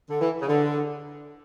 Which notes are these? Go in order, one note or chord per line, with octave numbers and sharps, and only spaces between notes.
D3
E3
C#3
D3